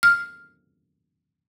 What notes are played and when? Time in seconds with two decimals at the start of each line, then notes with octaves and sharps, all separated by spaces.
0.03 F6